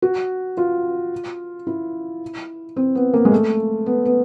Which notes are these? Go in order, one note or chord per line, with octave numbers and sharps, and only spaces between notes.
F#4
F4
E4
C4
B3
A#3
G#3
A3
B3
B3